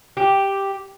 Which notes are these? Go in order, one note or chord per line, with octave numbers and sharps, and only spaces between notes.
G4